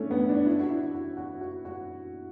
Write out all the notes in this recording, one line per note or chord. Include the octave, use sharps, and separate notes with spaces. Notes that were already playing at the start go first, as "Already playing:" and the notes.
Already playing: A3 C#4 D4 E4
B3
D4
E4
F#4
E4
F#4
F#4
F#4
F#4